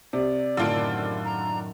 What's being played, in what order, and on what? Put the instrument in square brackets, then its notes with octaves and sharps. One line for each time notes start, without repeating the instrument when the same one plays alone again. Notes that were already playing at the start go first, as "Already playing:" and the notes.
[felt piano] C3 [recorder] D5
[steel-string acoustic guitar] F#2 A2 D#3 [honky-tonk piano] D3 F4 D7
[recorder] A#5